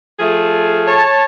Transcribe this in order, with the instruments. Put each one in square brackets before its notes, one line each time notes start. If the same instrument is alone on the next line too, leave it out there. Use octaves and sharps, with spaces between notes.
[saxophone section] F3 A3 G#4
[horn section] C#5 A5